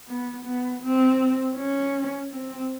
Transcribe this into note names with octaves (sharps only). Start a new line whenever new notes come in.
B3
B3
C4
C#4
C4